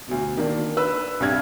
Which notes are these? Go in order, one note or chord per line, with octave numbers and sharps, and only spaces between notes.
D2 B2
D#3 A#3 D4
B4 E6
C2 G2 D4 F6 G#6